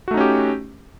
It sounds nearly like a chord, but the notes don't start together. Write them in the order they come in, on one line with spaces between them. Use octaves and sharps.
F#4 A3 D#4 C#4 G4